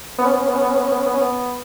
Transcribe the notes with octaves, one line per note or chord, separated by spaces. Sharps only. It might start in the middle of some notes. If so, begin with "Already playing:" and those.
B3
C#4
B3
C#4
B3
C#4
B3
C#4
B3
C#4
B3
C#4
B3
C#4
B3